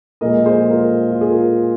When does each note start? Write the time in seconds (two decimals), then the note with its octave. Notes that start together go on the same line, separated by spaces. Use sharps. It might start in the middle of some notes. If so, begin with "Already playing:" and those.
0.21 A#2 F3 G#3 A#4 D#5
0.46 G#4 C5
0.70 F4 A#4
1.11 F4
1.21 G#4
1.31 F4 A#4